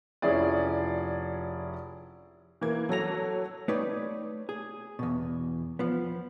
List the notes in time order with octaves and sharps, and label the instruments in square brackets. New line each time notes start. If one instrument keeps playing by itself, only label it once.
[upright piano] F1 F3 C#4 E4 G#4 D5
[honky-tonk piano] E3 A#3 G#6
F#3 A4 A#6 F7
[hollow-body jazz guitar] A3 D#4 G4 B4 C#5 D5
G#4
E2 B2
F3 B3